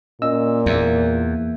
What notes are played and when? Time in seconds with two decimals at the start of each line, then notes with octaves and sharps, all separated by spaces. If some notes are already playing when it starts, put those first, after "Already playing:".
0.22 A#2 C#4 D#5 E6
0.66 E2 A#3 E5